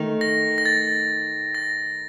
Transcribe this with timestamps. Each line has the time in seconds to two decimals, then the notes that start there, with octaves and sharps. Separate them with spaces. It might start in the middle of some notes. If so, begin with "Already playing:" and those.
Already playing: D#3 A3 D#4
0.21 A#6
0.58 A#6
0.66 A6
1.55 A#6